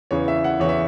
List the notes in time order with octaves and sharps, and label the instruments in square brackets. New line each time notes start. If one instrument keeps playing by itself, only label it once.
[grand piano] E2 C#3 E3 C#5
E5
F#5
E2 C#3 E3 C#5
E5